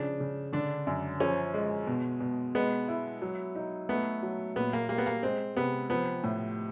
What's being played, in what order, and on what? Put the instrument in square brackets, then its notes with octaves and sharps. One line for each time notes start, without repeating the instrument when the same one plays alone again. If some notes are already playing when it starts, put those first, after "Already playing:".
Already playing: [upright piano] C#3 F3 [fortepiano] D4
[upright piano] C#3
[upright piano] D3 [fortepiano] D4
[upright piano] F#2
[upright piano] F3 [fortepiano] C#4
[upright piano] G#3
B2
B2
[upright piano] G#3 [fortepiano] B3
[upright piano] E4
F#3
D#4
[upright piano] A3 [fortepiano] B3
[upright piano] F#3
[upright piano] A#2 [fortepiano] B3
[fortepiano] A#3
[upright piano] G3 [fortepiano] A#3
[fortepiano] B3
A#3
[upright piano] G#3 [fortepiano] C4
[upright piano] C3 [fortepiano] B3
[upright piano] F3 [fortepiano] B3
[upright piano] A2